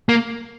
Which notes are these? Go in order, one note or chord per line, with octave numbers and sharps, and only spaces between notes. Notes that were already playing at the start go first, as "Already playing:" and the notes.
A#3